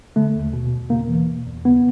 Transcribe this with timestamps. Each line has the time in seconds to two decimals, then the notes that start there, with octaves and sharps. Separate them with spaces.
0.16 D3 A3
0.35 D#2
0.53 B2
0.73 E2
0.90 C#3 A#3
1.09 E3
1.28 B2
1.47 E2
1.65 C#3 B3